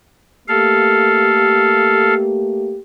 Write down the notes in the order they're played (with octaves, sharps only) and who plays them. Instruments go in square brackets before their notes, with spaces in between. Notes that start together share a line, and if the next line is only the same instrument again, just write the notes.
[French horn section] A3 A#3 G4 [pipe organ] A4 F5